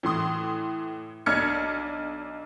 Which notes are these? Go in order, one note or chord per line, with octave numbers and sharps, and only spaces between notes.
A2 E3 C6 D#6
B1 D4 F6 G#6 C#7